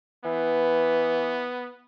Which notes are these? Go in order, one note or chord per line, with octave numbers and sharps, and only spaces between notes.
E3 B3